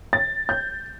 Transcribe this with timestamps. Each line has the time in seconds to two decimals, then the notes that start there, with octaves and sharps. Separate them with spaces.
0.13 A6
0.49 G6